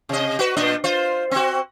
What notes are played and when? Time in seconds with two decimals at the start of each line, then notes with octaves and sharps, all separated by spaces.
0.09 C3 D#5
0.39 F#4 B4
0.57 A#2 D4 D#5
0.84 F4 C5
1.31 C4 F#4